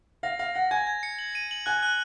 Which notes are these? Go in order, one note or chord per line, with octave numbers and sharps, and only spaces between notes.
F5 A#6
F5 A#6
F#5 A#6
G#5 G#6
G#6
C#7
F#7
D#7
F#7
G#5 F#6
F#6